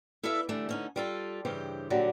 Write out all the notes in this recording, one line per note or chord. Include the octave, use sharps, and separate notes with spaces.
E4 A4 B4 D5 E5 F5
D3 E3 G3 A3 D4
D3 C#4 D#4
G3 F4 A4
G2 C#3 E3 G4 C5
A#2 D3 F#3 G3